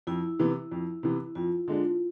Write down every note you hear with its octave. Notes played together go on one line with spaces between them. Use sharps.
F2 E4
C3 E3 B3
F2
C3 E3 B3
F2 F4
D3 G#3 D4